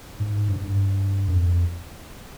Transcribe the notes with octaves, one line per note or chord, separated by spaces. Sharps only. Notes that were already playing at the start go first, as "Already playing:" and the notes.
G#2
G2
G#2
G2
F#2
F2